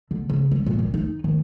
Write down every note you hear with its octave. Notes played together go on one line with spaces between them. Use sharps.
D3
C#3
G3
A#2
D#3
D#4
D#3